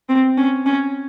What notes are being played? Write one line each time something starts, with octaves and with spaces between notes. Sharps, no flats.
C4
C#4
C#4